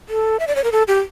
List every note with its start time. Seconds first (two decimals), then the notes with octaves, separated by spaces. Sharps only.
0.09 A4
0.40 E5
0.47 D5
0.56 C#5
0.64 A#4
0.72 A4
0.88 G4